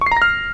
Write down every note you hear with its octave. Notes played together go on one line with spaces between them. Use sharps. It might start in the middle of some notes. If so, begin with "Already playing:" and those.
C#6
C7
A#5
A#6
F6